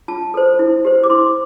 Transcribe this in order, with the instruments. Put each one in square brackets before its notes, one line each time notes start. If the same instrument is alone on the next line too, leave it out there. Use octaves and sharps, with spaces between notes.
[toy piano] F4 A5
A4 C5
E4
G4 C5
D6
E4 C6